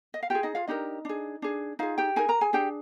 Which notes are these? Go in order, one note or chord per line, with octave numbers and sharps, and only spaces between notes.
D#5
F5
F4 G4 G#4 G5
D#4 D#5
F4 F5
D4 D#4 G4 A#4 D#5
D4 G#4
D4 G#4
D#4 F4 G#4 F5
G4 G5
D#4 G#4 A#4 G#5
A#4 A#5
G#4 G#5
D4 G4 G#4 G5